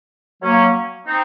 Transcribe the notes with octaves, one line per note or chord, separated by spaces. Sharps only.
F#3 A#3 C#4
C4 D#4